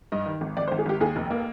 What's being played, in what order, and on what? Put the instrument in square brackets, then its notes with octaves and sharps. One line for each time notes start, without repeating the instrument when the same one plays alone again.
[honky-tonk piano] G2 D#5
D#3
G#1
G#1 D5
C5
G#1
G#4
G#1 G4
D#2 G#4
F1
A#3